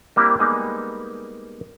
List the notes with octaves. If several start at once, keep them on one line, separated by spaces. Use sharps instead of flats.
G3 A#3 C4 D4 E4 G4
G3 G#3 A#3 B3 D#4 G#4